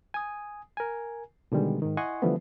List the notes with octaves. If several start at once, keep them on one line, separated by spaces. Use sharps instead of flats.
G#5 D#6
A#4 G#5
B2 D3 D#3 G3 G#3
G#2 D#3
E4 D#5 F#5 G#5 C6 C#6
D3 E3 F3 G3 A3 B3